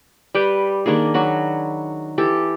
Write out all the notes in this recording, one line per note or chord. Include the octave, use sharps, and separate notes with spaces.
G3 G4 B4 G5
D#3 A#3 D4 G#4
F#3 F#4 B5
E3 G4 A4